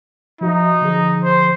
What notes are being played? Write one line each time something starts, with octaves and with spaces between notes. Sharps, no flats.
F3 D#4 F#4 E5
D3 F3 G#4
C5